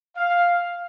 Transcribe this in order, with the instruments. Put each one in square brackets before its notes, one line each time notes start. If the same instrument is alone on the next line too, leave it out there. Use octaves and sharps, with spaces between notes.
[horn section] F5